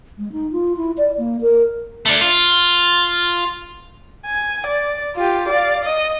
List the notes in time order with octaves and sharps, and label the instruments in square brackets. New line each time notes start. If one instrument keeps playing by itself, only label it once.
[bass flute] G#3
D#4
F4
E4
D5
A#3
A#4
[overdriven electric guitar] A3 D4
F4
[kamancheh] G#5
D5
F4 G4
D5 F5
D#5